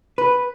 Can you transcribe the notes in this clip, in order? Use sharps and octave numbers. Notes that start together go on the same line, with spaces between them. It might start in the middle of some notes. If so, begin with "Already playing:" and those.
B4